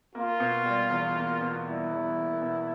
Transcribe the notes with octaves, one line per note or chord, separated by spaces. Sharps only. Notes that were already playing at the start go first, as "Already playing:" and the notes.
A#3 F4
B2
G3
E2
A#3
B2
G3 E4
E2
A#3
B2